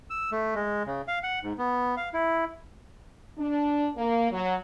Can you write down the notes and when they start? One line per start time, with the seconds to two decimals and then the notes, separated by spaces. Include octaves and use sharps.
0.10 E6
0.32 A3
0.55 G#3
0.87 C#3
1.08 F5
1.24 F#5
1.43 G#2
1.58 B3
1.97 F5
2.13 E4
3.38 D4
3.96 A#3
4.31 F#3